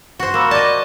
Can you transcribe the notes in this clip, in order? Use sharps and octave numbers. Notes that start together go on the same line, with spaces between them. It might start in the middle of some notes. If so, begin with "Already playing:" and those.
F#4 C5
A#3 B5 E6 E7
D5 D#5 A5 D6